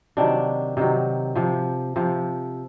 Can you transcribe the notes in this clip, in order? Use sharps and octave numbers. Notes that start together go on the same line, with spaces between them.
C3 D#3 F#3 D4
C3 D#3 F#3
C3 F3
C3 F3